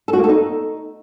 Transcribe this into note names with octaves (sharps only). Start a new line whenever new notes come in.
A4
F#4
A#3
A4
D#4